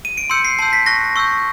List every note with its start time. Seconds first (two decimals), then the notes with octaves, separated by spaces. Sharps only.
0.05 D#7
0.17 D7
0.30 C6 E6 G6 C#7
0.45 C7
0.59 A5 C6 E6 G6 C7
0.73 B6
0.86 C#6 F#6 A#6
1.16 C#6 E6 G6